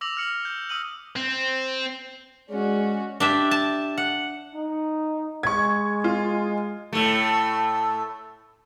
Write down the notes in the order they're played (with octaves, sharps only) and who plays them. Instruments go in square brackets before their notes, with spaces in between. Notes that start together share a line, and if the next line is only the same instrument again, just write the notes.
[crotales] D6 E6 A#6 F7 F#7
F6 C#7 F#7
G6
D#6 E6 D#7 F#7
[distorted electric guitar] C4
[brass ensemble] G#3 [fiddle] C#4 F#4 [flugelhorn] D5
[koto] D4 G4 E5
A5
F#5
[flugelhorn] D#4
[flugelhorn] G#3 [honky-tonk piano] C#6 G#6
[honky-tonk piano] F4
[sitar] A2 A3